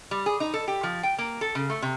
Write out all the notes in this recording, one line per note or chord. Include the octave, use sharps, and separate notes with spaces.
G3
G#4
D#4
A4
G4
F3
G5
A#3
A4
C#3
A3
C3